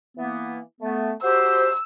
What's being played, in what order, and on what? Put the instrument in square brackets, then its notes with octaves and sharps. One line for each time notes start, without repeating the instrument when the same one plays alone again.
[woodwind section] E3 A#3 B3
A3 B3
[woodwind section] F#4 G4 C5 [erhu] E6